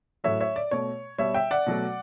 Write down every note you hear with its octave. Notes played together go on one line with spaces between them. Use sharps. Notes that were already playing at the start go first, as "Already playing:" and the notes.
A2 F#3 A3 C#5 E5
C#5 E5
D5
B2 A3 C#5
B2 G3 C#5 E5
E5 G5
D5 F#5
B2 F#3 A3